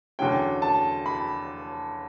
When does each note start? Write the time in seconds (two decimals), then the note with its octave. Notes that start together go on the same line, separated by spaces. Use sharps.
0.19 E2 D3 F#3 C#4 G5
0.62 A5
1.06 B5